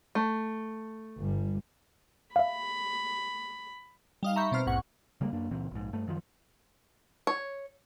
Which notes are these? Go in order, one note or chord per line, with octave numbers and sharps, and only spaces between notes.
A3
G1 G3
E5 F5 B5
G3 D#4 F5
E5 A#5 B5 C#6 G6
B2 C4 C5 F6
A#1 E2 G#2 F#5 C#6
C#3 G3 G#3 A#3
F#2 A#3 D4
C#2 A#2 E3 C4
A#1 G#2
G2 A3
F#2 D#3 F3
C#5